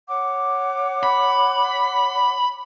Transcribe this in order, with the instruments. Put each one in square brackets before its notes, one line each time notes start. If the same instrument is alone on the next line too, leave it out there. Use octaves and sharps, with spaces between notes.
[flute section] C#5 F#5 D6
[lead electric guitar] B5